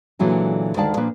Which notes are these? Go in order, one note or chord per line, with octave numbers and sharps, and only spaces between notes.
A#2 D3 E3 F#3 G#3
D2 D#3 G#3 D5 F5 A5
A#2 F3 A#3 D4 B4